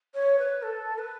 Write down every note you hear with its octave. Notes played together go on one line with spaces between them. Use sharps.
C#5
B4
A4
B4